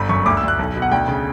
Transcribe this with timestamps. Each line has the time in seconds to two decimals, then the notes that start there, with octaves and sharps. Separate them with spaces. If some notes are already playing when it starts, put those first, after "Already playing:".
Already playing: G1 B5
0.09 F#2 C#6
0.26 D2 D6
0.37 E6
0.43 D2
0.48 F#6
0.59 B1
0.75 B2
0.82 F#5
0.91 D2 G5
1.08 C#3